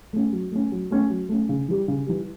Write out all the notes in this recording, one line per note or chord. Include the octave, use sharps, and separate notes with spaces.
A3 C#4
F#3
A3 C#4
F#3
A3 C#4
F#3
A3 C#4
C#3
E3 G3
C#3
E3 G3